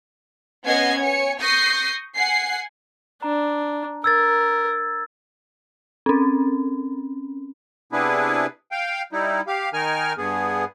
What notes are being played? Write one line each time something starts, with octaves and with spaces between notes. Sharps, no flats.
B3 C#4 D#5 F#5 G#6 C7
C#5 G#5 C#7
C#6 D#6 G6 A#6 C7
F#5 G#5 C7
D4 A#5
A#4 E6 G#6 A6
C4 C#4
C3 B3 D4 E4 G#4 B4
F5 G5
G3 D#4 E4
G4 F5
D#3 D#4 A#4 G#5 F6
G2 B3 G#4